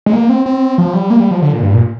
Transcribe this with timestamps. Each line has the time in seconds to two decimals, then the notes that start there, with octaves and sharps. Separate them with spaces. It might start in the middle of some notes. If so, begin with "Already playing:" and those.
0.06 G#3
0.13 A#3
0.29 C4
0.46 C4
0.78 F3
0.93 G3
1.10 A#3
1.20 G3
1.31 F3
1.42 D3
1.52 A#2
1.63 G2
1.74 A#2